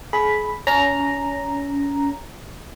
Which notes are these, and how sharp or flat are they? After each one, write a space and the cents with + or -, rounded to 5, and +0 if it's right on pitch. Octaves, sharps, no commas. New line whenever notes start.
G#4 +35 B5 +0
C#4 +30 A#5 +0